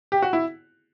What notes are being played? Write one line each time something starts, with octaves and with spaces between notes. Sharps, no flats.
G4
F#4
E4